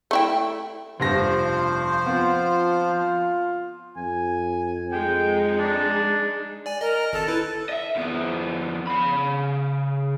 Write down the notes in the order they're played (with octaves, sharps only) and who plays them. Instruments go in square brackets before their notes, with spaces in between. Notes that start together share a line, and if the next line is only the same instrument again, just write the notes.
[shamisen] A3 E4 G5
[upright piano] F1 G2 A#6 [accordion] F3 C5
[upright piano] B3 C4 [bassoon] F4
[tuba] F2 [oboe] G#5
[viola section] G#3 D#4 [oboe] G5
[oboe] D4
[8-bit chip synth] D5 G#5
[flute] A#4 [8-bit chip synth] D#5
[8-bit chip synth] G#1 A5 [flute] A4
[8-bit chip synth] E4 B4
[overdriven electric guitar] D#5 E5
F2 B3
C#3 B5